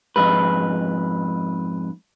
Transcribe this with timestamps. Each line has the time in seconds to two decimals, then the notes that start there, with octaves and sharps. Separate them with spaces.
0.16 F2 G#2 B4